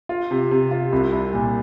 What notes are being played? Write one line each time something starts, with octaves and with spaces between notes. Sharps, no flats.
F4
C3
C3
F4
C2
C2
A#2